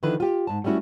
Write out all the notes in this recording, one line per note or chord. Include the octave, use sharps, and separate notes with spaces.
D3 D#3 F3 E4 B4
F4 G4
G#2 A5
G3 A3 C#4 E4 F#4